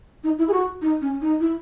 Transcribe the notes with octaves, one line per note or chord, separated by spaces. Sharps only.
D#4
E4
G#4
F#4
D#4
C#4
D#4
E4